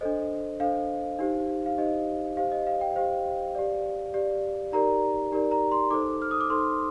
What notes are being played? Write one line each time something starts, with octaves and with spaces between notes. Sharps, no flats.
D4 A4 C5 D#5
D4 A4 C5 F5
D#4 G4 C5
F5
D#4 G4 C5 D#5
G4 C5 F5
D#5
F5
G5
G4 C5 F5
G4 D5
G4 D5
D#4 G4 A#4 D5 A#5
D#4 G4 A#4 D5
A#5
C6
D#4 A4 C5 D6
F6
D#6
D6
D#4 A4 C5 C6